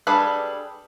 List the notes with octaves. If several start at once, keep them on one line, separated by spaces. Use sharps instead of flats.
G3 D4 G#4 A4 B4